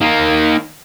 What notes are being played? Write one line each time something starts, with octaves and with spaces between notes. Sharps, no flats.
D#3 A#3